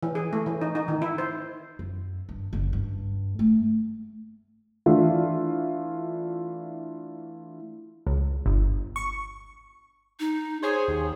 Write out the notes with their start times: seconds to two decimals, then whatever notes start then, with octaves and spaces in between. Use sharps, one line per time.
0.03 E3
0.15 G#4
0.33 A3
0.46 E3
0.62 D#4
0.75 D#4
0.88 D#3
1.02 E4
1.18 C5
1.79 F#2
2.29 G2
2.53 F#1
2.73 G2
3.39 A3
4.86 E3 A3 D4 E4 F4
8.07 C#2
8.46 G1
8.96 C#6
10.20 D#4
10.63 G#4 C5 C#5 G#5
10.88 D#2